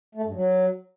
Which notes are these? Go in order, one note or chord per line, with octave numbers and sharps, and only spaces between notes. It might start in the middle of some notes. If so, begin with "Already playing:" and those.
A3
G2
F#3